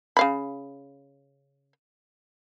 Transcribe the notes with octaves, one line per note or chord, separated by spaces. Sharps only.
C#3 F5 B5